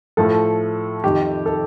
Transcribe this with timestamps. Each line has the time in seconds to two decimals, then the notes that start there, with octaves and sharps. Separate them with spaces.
0.17 A2 F3 A4
1.04 F2 D#3 G4
1.46 A4